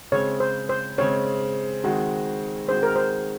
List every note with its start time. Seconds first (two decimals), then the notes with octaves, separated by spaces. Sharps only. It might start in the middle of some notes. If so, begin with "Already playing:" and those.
0.12 C#3 G#3 C4 C#5
0.40 C5
0.69 C5
0.98 C#3 G#3 C4 C#5
1.84 D#3 G#3 C4 F#4
2.69 D#3 G#3 C4 F#4 C5
2.83 A#4
2.96 C5